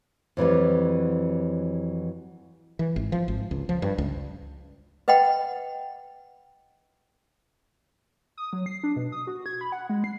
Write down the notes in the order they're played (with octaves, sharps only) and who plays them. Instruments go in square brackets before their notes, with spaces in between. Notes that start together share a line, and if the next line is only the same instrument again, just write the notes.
[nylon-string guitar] F2 E3 F#3 G3
[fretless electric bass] E3
G#1
F3
G#1
C#2
F3
G2
C#2
[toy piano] B4 D#5 F#5 G5 B5
[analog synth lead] D#6
F#3
C7
D4
B2
D#6
F#4
G#6
B5
F#5
G#3
C7